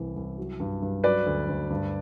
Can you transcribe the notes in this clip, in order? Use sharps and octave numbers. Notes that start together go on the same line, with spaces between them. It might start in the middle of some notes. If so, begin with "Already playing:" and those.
Already playing: C2 E3
C2
F#3
G2
G2
F#3 B4 D5
D2
D2
G2